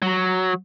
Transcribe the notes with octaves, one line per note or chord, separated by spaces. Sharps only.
F#3